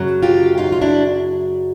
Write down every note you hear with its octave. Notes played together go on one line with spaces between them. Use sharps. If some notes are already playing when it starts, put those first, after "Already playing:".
Already playing: F#2 C#3 F#3
F4 G4
D#4 F4
F4
D4 E4